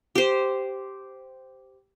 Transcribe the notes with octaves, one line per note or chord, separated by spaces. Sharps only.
G4 C5